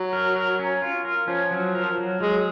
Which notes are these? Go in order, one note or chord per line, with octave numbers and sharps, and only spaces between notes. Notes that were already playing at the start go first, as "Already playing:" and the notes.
Already playing: F#3
A#4
A#4
C#4
F4
A#4
F3 C#4
F#3
A#4
F#3
F#3 G#3